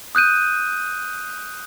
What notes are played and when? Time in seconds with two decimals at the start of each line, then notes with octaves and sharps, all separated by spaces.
0.15 D#6 F#6 G6 D#7